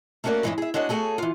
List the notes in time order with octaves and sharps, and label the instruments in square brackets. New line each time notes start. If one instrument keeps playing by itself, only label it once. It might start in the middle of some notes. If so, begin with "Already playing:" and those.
[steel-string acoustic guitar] A3 A#3 C#4 F#4 A#4 D5
G2 E3 G#3 B3 C#4 E4
G#4 E5
G#3 D4 F#4 C#5 D#5
A3 F#4 G#4 A4 C#5 G#5
E3 F4